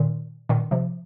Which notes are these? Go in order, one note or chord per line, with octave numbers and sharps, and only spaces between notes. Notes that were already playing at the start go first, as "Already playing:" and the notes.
Already playing: A#2 D#3
A#2 D#3
C3 F3